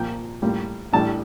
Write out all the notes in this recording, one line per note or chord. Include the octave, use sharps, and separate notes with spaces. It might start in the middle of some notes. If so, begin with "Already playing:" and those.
Already playing: A#2 F3 A#3 G5
A2 G3 A#3 F4
A1 A2 G3 D4 A5